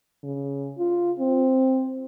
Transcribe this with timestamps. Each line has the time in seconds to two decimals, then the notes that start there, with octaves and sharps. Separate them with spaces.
0.23 C#3
0.78 F4
1.19 C4